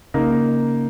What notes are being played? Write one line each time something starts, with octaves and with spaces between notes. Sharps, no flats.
C#3 A#3 D#4 A#4